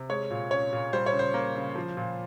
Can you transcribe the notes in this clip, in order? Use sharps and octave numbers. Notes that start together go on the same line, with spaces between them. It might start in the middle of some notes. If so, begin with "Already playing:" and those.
Already playing: C3
G#3 C#5
A#2
C#4 C#5
A#2
G3 C5
C#5
C#3
C5
A#3
C#3
F3
A#2